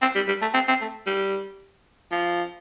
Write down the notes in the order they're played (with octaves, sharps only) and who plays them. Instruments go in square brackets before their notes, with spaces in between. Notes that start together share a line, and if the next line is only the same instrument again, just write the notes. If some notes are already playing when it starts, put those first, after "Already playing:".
[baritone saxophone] C4
G3
G3
A3
C4
C4
A3
G3
F3